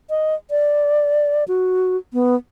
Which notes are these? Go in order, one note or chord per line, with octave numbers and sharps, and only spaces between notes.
D#5
D5
F#4
B3